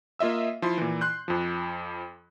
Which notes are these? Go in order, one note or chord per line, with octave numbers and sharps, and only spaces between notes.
A#3 F4 D#5 E5 E6
F3 E4 C6
A#2 E3
C6 F#6 G6
F2 F3